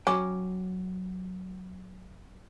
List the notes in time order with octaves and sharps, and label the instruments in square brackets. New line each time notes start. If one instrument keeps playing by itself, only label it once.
[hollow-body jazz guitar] F#3 G5 [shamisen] C#4 [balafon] D6